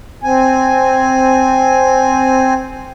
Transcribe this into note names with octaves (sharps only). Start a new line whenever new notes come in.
C4 G#5